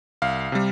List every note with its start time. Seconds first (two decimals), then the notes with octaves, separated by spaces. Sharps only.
0.22 C2 F5
0.52 C3 G3